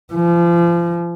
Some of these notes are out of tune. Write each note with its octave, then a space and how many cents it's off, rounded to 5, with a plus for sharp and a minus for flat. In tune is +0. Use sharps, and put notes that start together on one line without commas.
F3 -35